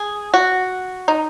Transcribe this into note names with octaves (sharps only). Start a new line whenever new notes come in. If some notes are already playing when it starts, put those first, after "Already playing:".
Already playing: G#4
F#4
D#4